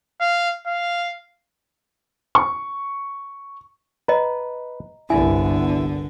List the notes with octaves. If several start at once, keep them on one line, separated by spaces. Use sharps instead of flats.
F5
F5
C#6
B4 D#5 A#5
G1 C2 D3 B3 E4 G#5